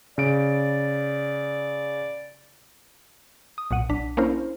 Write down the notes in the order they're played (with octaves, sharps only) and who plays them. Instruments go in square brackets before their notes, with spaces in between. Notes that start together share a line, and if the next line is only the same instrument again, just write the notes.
[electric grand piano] C#3 D7 [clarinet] D5
[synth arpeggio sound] D#6
B1 A#2 F#5 D#7
B1 D4 B6
A#3 C#4 D4 E4 A#4 C5